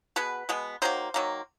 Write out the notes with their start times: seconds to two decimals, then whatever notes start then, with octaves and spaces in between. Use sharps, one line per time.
0.16 B2 G#3 B3 B4
0.49 B2 G#3 B3
0.82 D#3 F#3 A#3 C5
1.14 D#3 F#3 A#3